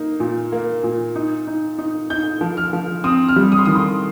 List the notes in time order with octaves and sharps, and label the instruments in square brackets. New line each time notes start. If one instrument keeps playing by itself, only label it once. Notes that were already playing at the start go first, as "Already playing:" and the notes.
Already playing: [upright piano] A#3 D#4
A#2
A#3
A#2
D#4
D#4
D#4
D#4 G6
F3
F6
F3
C4 D#6
F6
G3
D#6
C6
D#3 D#6
C6